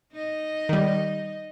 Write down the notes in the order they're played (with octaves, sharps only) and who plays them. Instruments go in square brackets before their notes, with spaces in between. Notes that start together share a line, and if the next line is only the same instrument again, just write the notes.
[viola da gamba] D#4 D#5
[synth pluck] D#3 G3